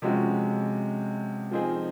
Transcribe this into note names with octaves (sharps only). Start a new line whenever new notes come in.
C3 F3 G#3 C#4 F#4
F3 C4 D#4 G#4